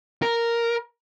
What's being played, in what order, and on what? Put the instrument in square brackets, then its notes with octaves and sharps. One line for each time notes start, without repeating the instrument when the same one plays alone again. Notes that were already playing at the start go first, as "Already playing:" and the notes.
[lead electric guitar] A#4